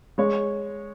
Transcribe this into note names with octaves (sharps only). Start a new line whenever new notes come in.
G#3 C#5